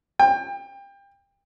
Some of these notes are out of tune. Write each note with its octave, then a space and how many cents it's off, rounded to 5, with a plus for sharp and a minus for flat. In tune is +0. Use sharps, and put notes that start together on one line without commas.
G5 +25